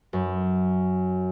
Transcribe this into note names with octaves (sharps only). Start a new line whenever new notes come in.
F#2